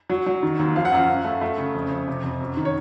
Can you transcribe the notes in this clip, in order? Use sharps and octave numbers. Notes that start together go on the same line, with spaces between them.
F#3
F#3
D#3
D#2
F3 F5
F#5
F#2 F5
F#2
A3
A3
C#3
F2
F2
C3
F2
F#2
D#3
C#5